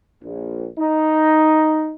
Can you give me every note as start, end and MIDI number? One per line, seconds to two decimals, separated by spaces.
0.23 0.68 34
0.79 1.94 63